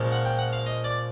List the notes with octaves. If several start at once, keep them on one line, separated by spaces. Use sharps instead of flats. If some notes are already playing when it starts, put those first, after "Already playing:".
Already playing: A#2 F3 G#3 C#4
F#5
G5
F#5
F5
D#5
D5